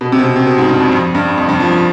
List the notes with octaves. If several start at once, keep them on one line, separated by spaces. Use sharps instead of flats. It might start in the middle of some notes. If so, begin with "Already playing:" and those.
B2
C3
B2
C3
C3
B2
G#2
G2
F2
F2
G2
F2
G2
F3
F3